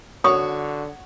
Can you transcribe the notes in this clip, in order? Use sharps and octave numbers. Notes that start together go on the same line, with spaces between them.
D3 F#4 C#5 C#6 D#6